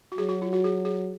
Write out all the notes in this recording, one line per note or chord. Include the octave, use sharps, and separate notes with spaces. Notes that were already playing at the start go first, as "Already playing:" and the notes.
F#4
F#3 G#4
F#4
F4
F#4
G#4
G#4